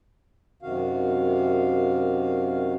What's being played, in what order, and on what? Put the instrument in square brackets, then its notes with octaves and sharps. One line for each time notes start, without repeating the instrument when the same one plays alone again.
[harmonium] F#2 C3 D#3 F#4 F5